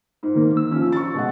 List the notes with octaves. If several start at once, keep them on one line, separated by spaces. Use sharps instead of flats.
G#2
D#3 A#3
E6
F3 C#4
C#6 A6
B2 G#3 F#5